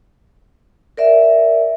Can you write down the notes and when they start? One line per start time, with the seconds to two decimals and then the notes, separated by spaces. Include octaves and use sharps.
0.97 A#4 D5 E5